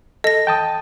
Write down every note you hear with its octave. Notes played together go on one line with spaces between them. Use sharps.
A4 D#5 A#6
G5 A5 D#6